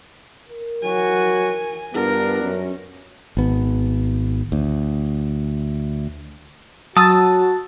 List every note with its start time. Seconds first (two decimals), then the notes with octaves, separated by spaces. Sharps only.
0.49 A#4
0.83 F#3 F#4 G#5
1.94 G2 B3 D4 F4 A#4
2.43 F#2 C#4
3.37 G#1 B3
4.52 D2
6.97 F#3 F#4 A5 D#6 E6 A6